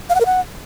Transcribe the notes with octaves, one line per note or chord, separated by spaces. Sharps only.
F5
F#5
A#4
F#5